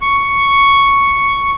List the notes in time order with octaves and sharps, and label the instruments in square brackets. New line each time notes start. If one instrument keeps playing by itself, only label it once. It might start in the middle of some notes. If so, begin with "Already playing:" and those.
[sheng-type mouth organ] C#6